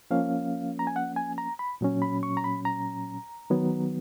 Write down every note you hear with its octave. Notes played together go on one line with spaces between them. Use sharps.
F3 A#3 C#4 F5
A#5
G#5
F#5
G#5
A#5
B5
A#2 F#3 C#4
B5
C#6
A#5
B5
A#5
D#3 F#3 B3